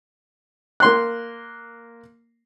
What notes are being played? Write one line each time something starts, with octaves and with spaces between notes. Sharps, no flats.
A#3 C6 F#6